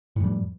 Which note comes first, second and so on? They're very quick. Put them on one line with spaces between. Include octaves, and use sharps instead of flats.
A2 F2 G3